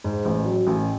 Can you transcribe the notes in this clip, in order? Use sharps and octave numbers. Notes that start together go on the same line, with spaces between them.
G#2
A1
F#3
A1